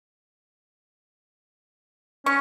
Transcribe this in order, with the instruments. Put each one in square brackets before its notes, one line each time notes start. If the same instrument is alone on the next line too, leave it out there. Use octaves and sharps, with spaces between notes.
[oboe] C#4 [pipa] C#6